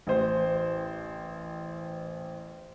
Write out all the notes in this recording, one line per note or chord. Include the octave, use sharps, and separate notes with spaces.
A1 C5